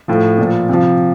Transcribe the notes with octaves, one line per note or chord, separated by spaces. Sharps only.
A2 F3
A#2 F3
C3 F3